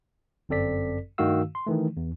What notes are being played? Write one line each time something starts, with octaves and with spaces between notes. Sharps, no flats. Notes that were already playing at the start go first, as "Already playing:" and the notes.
G1 F#2 C4 A4 D5 B6
G2 D#3 A3 F#4 F5 E6
C6
D#3 E3 A3
E2